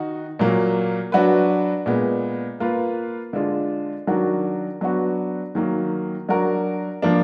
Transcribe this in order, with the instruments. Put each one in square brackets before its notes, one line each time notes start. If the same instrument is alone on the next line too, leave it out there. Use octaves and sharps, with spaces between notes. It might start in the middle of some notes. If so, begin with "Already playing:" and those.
Already playing: [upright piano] D#3 D#4 F#4
A#2 F#3 A#3
F#3 D4 F#4 B4
A#2 G#3 B3
A#3 F4 B4
D3 G#3 D4 F4
D#3 F#3 D4 F#4 A#4
F#3 B3 D4 F#4
D#3 F#3 A#3
F#3 D4 F#4 A#4
F3 A#3 D4